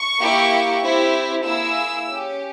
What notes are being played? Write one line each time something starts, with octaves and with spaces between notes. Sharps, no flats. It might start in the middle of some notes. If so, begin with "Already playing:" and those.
Already playing: C#6
A#3 E4 G4
C4 E4 G4
A#3 E4 G#4 E6
C#4 G4